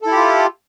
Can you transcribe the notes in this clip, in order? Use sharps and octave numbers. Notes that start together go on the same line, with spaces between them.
E4 F4 G4 A4